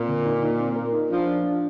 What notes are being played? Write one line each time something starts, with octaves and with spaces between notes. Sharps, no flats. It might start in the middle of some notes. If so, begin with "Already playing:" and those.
Already playing: A#2 C4
D3
D#4
D#4
C4
A#4
D#4
F3 D4
D4
D4